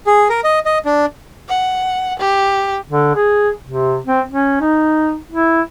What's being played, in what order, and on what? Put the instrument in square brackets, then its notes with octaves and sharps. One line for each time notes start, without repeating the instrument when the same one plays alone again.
[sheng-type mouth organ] G#4
A#4
D#5
D#5
D4
[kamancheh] F#5
G4
[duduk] D3
G#4
C3
C4
C#4
D#4
E4